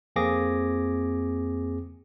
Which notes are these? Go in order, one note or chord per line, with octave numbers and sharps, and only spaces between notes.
F2 A#3 C4 G#4 D6 A#6